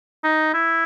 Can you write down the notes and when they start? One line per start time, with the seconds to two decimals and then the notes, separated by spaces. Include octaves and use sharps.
0.24 D#4
0.54 E4